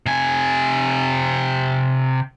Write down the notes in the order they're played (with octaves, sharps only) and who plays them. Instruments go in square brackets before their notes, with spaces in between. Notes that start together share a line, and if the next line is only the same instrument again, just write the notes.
[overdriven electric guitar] C3 G#5